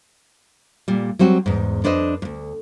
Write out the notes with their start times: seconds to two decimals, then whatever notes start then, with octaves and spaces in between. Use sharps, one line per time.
0.88 A#2 G3
1.19 F#3 G3 C4 F#4
1.46 E2 G#2
1.84 F2 D4 B4 C5 D#5
2.22 D2 G#2